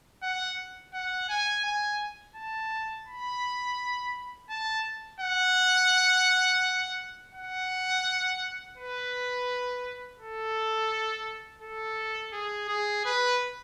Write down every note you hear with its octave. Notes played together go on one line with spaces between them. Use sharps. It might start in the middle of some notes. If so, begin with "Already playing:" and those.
F#5
F#5
G#5
G#5
A5
B5
A5
F#5
F#5
B4
A4
A4
G#4
G#4
B4